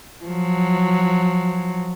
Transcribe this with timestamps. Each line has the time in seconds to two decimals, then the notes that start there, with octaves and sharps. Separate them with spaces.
0.25 F3 F#3